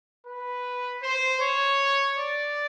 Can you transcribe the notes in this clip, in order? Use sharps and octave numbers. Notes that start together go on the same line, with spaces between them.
B4
C5
C#5
D5